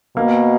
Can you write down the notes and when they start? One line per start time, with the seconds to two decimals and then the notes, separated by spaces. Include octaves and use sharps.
0.16 B2 A#3